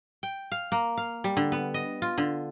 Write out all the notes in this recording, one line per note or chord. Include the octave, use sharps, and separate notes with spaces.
G5
F5
A#3
F5
G3
D3
B3
D#5
F4
D3